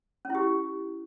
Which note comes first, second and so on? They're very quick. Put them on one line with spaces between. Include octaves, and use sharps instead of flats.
C#4 E4 G4